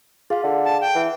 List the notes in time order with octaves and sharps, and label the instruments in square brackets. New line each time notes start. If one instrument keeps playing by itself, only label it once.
[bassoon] F4 [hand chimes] G#4 F5
[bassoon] D3
[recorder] A5
G5
[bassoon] E3 [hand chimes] F#5